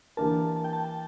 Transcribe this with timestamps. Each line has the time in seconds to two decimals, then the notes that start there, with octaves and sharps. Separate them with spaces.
0.17 E3 A#3 D4 G4 A#4 A5
0.56 A5
0.64 G5
0.73 A5
0.85 A5